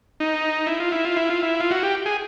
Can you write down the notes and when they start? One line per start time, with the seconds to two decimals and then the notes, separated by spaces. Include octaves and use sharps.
0.20 D#4
0.67 E4
0.80 F4
0.92 E4
1.05 F4
1.17 E4
1.30 F4
1.43 E4
1.60 F4
1.71 F#4
1.83 G4
2.06 G#4